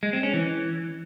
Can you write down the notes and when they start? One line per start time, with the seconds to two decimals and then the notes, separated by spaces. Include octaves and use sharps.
0.03 G#3
0.13 C4
0.23 C#4
0.34 E3